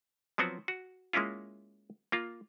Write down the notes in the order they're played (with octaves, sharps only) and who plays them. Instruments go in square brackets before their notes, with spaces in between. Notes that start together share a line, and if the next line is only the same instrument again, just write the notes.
[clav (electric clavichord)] F3 F#3 B3 C4 F#4
F#4
G#3 A#3 C#4 E4 F4
A#3 F4